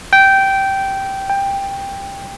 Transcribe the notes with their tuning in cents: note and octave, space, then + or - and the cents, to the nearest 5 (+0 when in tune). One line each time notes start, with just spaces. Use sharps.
G5 -10
G5 +15